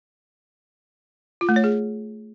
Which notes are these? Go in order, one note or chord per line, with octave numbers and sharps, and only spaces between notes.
F4
A3
C#5
G#4